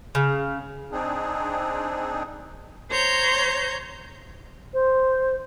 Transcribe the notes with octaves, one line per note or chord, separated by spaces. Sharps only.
C#3
C4 D4 D#4 G#4
C5 C#5 A#5 G6
C5